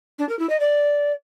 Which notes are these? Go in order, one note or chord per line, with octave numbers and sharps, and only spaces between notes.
D4
A#4
E4
D#5
D5